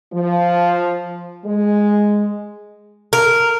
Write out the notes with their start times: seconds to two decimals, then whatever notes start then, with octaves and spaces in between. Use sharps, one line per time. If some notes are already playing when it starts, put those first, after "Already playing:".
0.13 F3
1.45 G#3
3.13 A#4